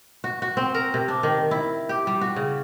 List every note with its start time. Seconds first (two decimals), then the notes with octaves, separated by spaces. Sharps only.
0.24 F#4
0.42 F#4
0.57 C4
0.74 A#4
0.94 C3
1.08 D4
1.23 D#3
1.51 E4
1.89 G4
2.07 G3
2.21 F#4
2.36 C#3